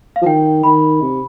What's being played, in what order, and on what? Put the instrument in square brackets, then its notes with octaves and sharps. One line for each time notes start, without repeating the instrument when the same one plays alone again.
[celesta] F5
[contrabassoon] F3
[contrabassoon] D#3 [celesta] G5
[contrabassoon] D#3 [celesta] B5
[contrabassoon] C3